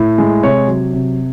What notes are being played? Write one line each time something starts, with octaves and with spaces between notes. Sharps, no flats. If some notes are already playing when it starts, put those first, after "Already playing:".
Already playing: A2
G#3
C3 C#5
F#3
C3